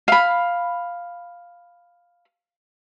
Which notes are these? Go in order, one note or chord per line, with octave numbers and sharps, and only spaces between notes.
F5 B5